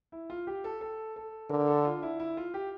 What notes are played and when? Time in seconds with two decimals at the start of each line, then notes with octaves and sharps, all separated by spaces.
0.12 E4
0.30 F4
0.47 G4
0.64 A4
0.81 A4
1.16 A4
1.50 D3 A#4
1.68 A4
1.85 F4
2.03 E4
2.20 E4
2.37 F4
2.54 G4